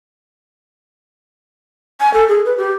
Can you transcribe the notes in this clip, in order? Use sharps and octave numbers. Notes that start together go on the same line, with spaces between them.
G#5
A4
G#4
B4
G4